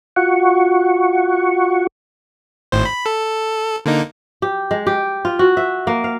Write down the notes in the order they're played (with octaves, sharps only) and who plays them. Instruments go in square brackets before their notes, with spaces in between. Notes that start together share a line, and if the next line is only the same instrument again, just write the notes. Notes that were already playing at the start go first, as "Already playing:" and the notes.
[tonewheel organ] F4 F#4 F#5 C#6
[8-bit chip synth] G#1 A2 C5
B5
A4
D3 A#3 D#4
[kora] G4
G#3
G4
F4
F#4
E5
A#3
F5